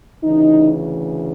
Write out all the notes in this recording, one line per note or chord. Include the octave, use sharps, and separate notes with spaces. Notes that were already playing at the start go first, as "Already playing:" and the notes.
D2 C#3 E3 D#4